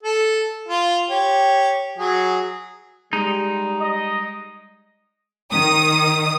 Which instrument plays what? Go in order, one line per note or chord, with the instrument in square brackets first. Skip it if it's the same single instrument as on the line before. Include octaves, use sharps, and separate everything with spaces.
[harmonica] A4
F4
G4 C#5
F#3 G#4
[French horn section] G3 [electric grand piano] G#3 [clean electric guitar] D#4
[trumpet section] D#5
[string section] D#3 D#6